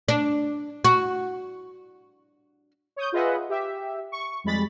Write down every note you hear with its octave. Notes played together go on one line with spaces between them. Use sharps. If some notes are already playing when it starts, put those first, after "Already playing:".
D4
F#4
C#5 D#6 G6
F4 G#4 B4 D#5 E5 F#5
G4 E5
C#6
F2 G3 G#3 B5 A6 B6